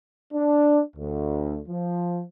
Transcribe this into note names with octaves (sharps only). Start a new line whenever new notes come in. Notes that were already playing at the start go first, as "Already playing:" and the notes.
D4
D2
F3